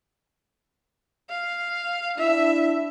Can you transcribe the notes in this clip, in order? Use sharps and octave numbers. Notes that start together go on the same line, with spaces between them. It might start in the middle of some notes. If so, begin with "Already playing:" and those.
F5
D4 E4 E5